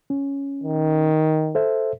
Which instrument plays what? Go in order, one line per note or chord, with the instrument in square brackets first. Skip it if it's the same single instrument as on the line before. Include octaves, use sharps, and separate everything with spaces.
[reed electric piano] C#4
[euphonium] D#3
[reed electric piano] A4 C5 E5